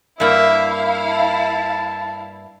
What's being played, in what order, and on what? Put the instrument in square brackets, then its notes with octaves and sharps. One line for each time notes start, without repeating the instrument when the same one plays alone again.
[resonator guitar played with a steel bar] G2 A#3 [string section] E4 F5 [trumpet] E5
[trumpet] A5